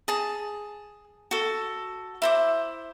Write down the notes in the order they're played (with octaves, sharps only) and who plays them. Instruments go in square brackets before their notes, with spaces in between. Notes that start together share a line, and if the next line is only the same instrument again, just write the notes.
[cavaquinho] G#4 A5
F#4 A4
E4 C5 D6